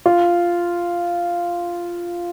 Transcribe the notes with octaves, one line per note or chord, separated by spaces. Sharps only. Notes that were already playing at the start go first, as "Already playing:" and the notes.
F4